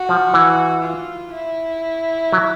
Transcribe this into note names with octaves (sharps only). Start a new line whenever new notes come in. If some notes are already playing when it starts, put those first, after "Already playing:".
Already playing: F#4
F3
E3
F4
E4
F#3